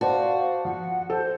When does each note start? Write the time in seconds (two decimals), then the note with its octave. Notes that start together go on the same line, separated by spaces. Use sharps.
0.01 F#4 C5 D5 F5 A5
0.65 F3 F#5
1.10 A4 C5